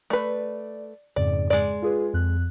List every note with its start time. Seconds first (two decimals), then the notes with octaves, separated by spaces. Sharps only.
0.10 A3 B4 D5
1.16 F2 G#2 C#3 D5
1.50 G#3 D5
1.82 F4 G#4 B4
2.13 F2 F#6